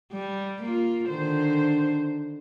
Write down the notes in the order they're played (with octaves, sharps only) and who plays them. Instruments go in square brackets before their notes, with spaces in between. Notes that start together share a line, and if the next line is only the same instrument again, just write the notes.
[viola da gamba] G3
A#3 F4
D3 D#3 C5